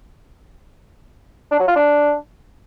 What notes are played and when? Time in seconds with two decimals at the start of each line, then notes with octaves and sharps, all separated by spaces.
1.52 D4
1.60 F#3
1.68 F4
1.76 D4